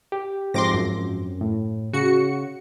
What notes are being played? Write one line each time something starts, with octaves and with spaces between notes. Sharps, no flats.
G4
G#2 F3 C4 C6 D6 A#6
F#2
A2
C#3 F#4 C#7